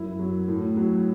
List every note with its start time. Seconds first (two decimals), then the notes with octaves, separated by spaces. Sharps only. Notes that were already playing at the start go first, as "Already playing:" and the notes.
Already playing: F#2 E4
0.19 F#3
0.48 A2
0.77 F#3